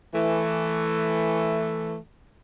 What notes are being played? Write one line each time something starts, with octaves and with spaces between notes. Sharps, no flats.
E3 A3